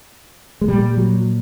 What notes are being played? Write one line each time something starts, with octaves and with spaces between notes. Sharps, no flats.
G#3
A#2 G3
F#3